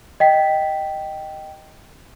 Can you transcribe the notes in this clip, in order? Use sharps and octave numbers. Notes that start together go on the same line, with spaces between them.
D#5 G5 B6